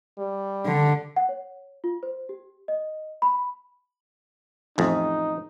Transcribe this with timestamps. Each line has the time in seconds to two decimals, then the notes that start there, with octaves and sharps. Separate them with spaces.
0.19 G3
0.66 D3
1.16 F#5
1.29 C#5
1.84 F4
2.03 C5
2.29 G4
2.68 D#5
3.22 B5
4.78 A1 F2 D#4